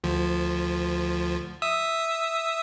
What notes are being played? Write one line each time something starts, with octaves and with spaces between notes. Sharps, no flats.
D2 F3
E5 D#6 E6